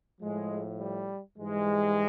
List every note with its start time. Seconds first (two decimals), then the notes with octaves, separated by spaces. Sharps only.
0.21 A2 F3 G#3
0.79 G3
1.38 G#2 E3 G3 G#3